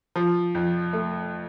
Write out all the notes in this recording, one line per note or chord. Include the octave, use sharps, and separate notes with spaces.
F3
F2
A3